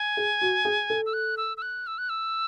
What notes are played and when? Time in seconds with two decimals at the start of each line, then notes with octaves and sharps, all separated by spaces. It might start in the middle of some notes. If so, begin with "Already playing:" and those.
Already playing: G#5
0.17 G#4
0.41 F#4
0.65 G#4
0.90 A4
1.06 E6
1.13 F#6
1.37 E6
1.57 E6
1.62 F#6
1.87 E6
1.98 F#6
2.09 E6